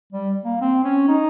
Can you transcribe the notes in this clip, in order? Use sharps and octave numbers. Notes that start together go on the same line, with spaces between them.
G3
A#3
C4
C#4
D#4